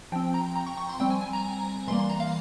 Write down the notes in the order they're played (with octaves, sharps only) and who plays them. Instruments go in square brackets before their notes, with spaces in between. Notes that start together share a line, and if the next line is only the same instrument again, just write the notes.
[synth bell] F3 C4 G5
A#5
A#5
C#6
C#6
C6
G3 C4 G5
G#5
G#5
A#5
E3 G3 A#3 C6
C6
A#5
F5